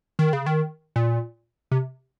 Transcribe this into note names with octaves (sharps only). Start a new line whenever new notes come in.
D#3
C#3
D#3
A#2
C3